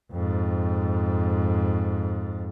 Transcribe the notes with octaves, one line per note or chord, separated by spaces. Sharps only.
F2 G#2